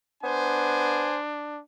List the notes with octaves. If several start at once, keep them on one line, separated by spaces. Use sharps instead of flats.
B3 D4 C5 G#5